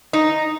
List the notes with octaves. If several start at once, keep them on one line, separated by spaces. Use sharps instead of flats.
D#4